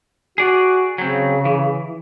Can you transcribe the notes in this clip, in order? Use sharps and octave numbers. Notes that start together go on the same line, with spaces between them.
F#4 G#4 D5
C#3 F#3 C4
E3